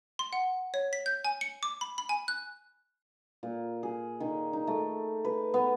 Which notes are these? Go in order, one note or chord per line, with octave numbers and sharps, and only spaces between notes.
C6
F#5
C#5
B6
G6
G#5
C#7
D6
B5
B5
G#5
F#6
A#2
G#4
D#3
D#4
A3
B4
B3